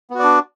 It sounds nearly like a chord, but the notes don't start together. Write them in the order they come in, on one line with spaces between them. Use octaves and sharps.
B3 F#4 D5 D4